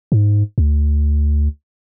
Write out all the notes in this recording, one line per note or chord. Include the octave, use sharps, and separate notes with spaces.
G#2
D2